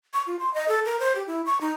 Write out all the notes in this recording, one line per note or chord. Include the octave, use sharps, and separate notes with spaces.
C#6
F4
C6
D#5
A4
A#4
C5
G4
E4
C#6
D#4